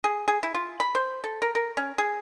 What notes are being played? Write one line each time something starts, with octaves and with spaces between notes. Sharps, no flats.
G#4
G#4
E4
F4
B5
C5
A4
A#4
A#4
C#4
G#4